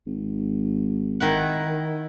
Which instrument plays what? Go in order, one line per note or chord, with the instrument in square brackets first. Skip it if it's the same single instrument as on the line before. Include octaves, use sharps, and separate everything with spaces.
[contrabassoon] G#1
[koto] D#3 E4 F#5